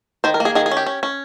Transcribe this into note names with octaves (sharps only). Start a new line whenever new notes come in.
D#3 C5
A#4
A#3
G#4
D#3 G#4
G#4
C#4
G4
C#4
C#4